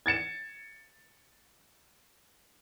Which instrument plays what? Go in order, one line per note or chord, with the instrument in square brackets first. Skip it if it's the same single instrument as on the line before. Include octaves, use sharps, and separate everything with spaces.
[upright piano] G#6 A6 C#7 E7